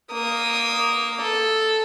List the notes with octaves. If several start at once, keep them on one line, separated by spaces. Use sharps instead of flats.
A#3 D#6
A4